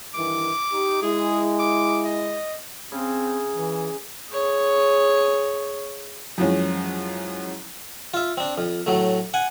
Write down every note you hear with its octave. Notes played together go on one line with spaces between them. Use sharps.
G2 D#3 E3 D6
D#4 G4
G#3 E4 G#4
D6
D#5
C#3 C4
E3
G#4 C#5
F#2 E3 F3 G#3 C#4
F4 E5
C4 D4
F2
A2 F#3 A3
F#5 G#5